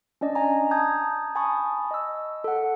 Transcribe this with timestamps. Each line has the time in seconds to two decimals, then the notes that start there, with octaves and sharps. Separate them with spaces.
0.21 C#4 D4 D5 D#5
0.35 G#5 A#5
0.71 A5 A#5 D#6 G6 G#6
1.35 G#5 A5 B5 C#6 D#6
1.91 D#5 E6
2.44 A4 F#5